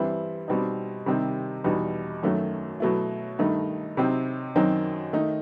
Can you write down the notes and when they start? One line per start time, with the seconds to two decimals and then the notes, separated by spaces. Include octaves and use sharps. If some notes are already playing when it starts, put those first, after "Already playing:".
Already playing: G2 E3 G3 C4 E4
0.48 B2 G3 C4 D#4
1.06 C3 D#3 G3 C4 D#4
1.64 E2 B2 G3 D#4
2.23 F#2 D#3 F#3 A3
2.80 B2 F#3 A3 E4
3.39 G2 D#3 A3 D#4
3.97 C3 F#3 C4 D#4
4.56 F#2 D#3 F#3 C4 D#4
5.13 D#3 A3 D#4